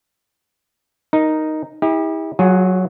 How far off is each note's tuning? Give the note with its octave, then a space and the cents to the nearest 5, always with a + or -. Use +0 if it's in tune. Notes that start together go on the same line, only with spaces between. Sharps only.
D#4 +0 A#4 +0
E4 -40 G4 +40
F#3 +0 F4 +40 G#4 +0